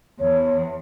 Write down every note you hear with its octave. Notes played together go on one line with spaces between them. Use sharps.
E2 C#5